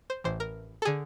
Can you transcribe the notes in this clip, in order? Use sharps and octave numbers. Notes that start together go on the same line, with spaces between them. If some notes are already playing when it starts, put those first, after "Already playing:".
C5
A1 A2 E3 C5
A#4
A4
D3 G#4